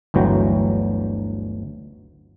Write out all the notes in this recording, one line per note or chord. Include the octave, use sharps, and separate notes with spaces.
G1 D2 E3 F#3 G5 A#5